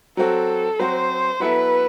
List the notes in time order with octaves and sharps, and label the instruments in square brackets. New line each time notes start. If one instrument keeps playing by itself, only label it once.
[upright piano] F#3 C4 F#4 [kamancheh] A4
[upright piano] F#3 C4 F#4 [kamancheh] C5
[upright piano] F#3 B3 E4 A4 E5 [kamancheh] B4